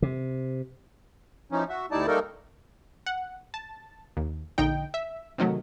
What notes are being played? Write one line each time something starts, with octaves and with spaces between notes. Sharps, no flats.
C3
E3 F3 C#4 D#4
F#4 E5
D2 G3 D#4 E4 D5 A5
G3 A3 A#3 D#4 A4 A#4
F#5
A5
D#2
A#1 D3 D#4 G5
E5
C3 D#3 F#3 A3